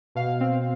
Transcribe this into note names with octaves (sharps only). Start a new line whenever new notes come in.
B2 F5
C4